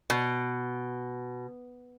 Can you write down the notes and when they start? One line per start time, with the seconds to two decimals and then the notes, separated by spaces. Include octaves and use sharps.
0.10 B2